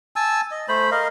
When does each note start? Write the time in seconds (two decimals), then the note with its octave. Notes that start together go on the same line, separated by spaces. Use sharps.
0.16 G#5 A5 E6
0.51 D#5
0.68 A3 C5 B5
0.91 A#4 D#5 F5